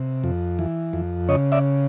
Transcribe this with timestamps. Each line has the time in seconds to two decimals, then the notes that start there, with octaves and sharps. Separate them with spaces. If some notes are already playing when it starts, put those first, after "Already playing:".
Already playing: C3
0.24 F2
0.59 E3
0.93 F2
1.29 C#3 C#5 D#5
1.52 D5 E5